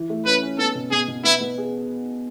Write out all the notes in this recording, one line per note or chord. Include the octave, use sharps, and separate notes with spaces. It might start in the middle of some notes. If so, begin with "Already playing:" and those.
Already playing: E3
A3
C#4 B4
C#4
B3 A4
B2
B2 G#4
B2
B3 E4
B3
G#4